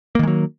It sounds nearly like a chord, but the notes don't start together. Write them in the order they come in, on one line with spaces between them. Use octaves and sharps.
A#3 D#3 G#3 F#3